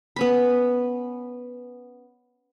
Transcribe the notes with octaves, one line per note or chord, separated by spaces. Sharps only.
B3 C#4 B5